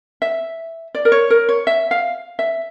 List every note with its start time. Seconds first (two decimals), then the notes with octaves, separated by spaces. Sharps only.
0.22 E5
0.95 D5
1.05 A#4
1.12 C#5
1.30 A#4
1.49 C#5
1.67 E5
1.91 F5
2.39 E5